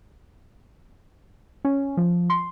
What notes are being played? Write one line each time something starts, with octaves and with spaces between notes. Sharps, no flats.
C#4
F3
C6